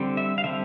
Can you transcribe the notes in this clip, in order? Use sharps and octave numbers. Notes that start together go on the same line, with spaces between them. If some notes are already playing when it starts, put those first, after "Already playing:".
Already playing: D3 G3 C4
E5
F5
D3 G3 C4 E5